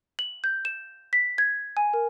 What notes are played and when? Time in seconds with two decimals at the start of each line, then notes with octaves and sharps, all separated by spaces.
0.19 F#7
0.44 G6
0.65 E7
1.13 B6
1.38 G#6
1.77 G#5
1.93 A#4